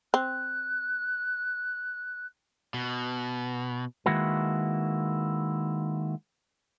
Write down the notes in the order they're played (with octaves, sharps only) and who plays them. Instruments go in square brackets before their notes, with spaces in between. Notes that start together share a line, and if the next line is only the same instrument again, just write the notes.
[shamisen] C4 [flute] F#6
[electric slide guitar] B2
[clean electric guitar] D#3 G#3 A#3 E4 F#4 B4